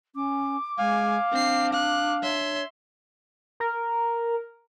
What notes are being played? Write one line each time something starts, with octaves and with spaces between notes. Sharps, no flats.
C#4 D6
G#3 F5 G#5
C4 D4 C7
F5 F#6
C#5 E5 C6
A#4